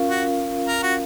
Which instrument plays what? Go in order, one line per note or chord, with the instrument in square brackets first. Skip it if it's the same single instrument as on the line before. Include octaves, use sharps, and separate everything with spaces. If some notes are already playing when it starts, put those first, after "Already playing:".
Already playing: [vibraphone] C#4 F4 A#4 F5
[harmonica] F#4
A#4
F#4